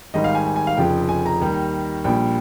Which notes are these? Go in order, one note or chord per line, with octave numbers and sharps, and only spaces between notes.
G#1 G#2 G3 D#5
F5
G#5
G#5
G#5
F5
F1 F2 C#3 F3 G5
G#5
A#5
D#2 D#3 G3
A#1 A#2 G3 G5